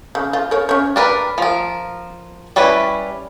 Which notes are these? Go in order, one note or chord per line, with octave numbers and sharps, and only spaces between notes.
C#3
F4
A#4 C#5
C#4 C#5
D4 A#4 B4
F3 A#4
G3 C#4 E4 B4